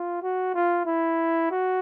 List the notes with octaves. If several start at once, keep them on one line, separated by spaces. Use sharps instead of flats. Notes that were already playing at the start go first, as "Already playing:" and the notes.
Already playing: F4
F#4
F4
E4
F#4